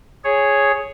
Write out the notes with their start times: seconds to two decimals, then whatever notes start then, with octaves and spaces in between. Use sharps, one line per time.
0.24 G#4 C#5